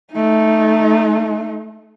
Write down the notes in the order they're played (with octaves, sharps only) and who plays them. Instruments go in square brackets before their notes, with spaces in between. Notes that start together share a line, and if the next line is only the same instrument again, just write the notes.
[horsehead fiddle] A3 D#4